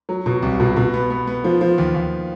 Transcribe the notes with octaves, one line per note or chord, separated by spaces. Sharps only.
F#3
B2
C2
B2
B2
B3
B3
B3
F3
F3
D#2
D#2